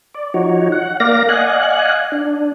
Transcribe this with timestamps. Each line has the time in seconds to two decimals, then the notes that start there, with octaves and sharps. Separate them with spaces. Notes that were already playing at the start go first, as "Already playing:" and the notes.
0.14 D5
0.34 F3 D#4 F#4 C#5
0.72 F#5
1.00 A#3 D5 F5 A#6
1.29 D5 D#5 F5 F#5 G#5 F#6
2.12 D4